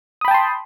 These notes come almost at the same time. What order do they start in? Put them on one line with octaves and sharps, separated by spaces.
D#6 B5 G5 A5 C6